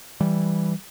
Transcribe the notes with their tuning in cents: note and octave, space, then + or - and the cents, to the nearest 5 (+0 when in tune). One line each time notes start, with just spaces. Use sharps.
E3 +0 G3 +0